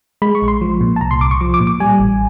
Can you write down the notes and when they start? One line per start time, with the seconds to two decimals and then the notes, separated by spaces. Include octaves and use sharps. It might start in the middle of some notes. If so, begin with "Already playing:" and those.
0.22 G#3 B5
0.35 C#6
0.42 A#1
0.48 C6
0.61 F3
0.81 A#2
0.96 A5
1.01 C2 A#5
1.11 C6
1.21 C2 D6
1.31 C#6
1.41 F3 D6
1.54 D6
1.60 A#2
1.67 D6
1.80 G3 G#5
2.00 A1